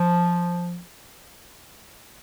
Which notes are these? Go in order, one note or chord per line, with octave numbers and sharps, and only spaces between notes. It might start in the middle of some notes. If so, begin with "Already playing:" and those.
Already playing: F3